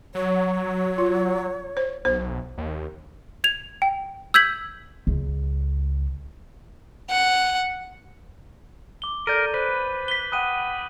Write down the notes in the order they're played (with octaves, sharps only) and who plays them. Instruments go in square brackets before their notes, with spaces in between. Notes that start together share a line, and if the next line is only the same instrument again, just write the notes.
[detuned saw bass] F#3 [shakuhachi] C#5
[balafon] F4
C5
[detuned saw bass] B1 [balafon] C5
[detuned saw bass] D#2
[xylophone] G#6 F7
G5
E6 G6 G#6 B6 F#7
[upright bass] C#2
[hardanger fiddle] F#5
[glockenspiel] D6 G7
[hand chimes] A4 D5 [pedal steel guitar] A#4 [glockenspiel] G6 A6 D#7
[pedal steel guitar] B4 [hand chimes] C5 [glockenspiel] F#6
[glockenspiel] B6 G7
[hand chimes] F#5 G5 B5 [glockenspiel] D#6 F#6 D#7